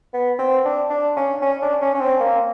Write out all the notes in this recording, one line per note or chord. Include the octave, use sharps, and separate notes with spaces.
B3
C4
D4
D4
C#4
C#4
D4
C#4
C#4
C4
A#3